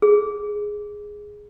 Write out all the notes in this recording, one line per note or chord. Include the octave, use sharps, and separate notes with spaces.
G#4